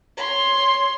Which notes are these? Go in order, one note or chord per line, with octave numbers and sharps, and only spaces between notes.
C#5 C6